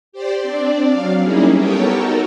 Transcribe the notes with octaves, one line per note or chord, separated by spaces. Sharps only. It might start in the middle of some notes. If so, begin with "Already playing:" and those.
G4 C5 D5
C4 D4 D5
F#3 F5
G3 A#3 C#4 D#4 E4 G#4
B3 G4 A4 A#4 C#5 G5
D#4 F#4 A4 A#4